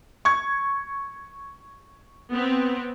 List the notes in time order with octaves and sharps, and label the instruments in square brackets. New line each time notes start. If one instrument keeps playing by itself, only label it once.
[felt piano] C#6 G#6
[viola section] B3 C4